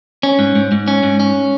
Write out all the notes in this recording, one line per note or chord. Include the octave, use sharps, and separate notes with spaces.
C#4
G#2
G#2
G#2
C#4
G#2
C#4